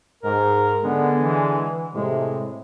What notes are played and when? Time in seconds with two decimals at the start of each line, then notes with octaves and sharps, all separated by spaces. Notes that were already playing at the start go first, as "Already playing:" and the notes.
0.23 G#2 A#4
0.83 D3 G#3 B3
1.21 E3
1.93 A2 C3 G#3